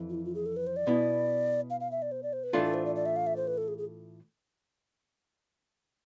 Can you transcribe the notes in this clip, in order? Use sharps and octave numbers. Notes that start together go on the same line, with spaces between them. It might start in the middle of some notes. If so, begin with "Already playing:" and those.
Already playing: F2 E3 A3
F4
E4
F4
G#4
A4
B4
C5
D5
B2 B3 E4
F5
F5
E5
D5
C5
D5
C5
B4
A2 E3 A3 D4 F4 A4
A4
C5
D5
D5
E5
F5
E5
C5
B4
A4
G#4
G#4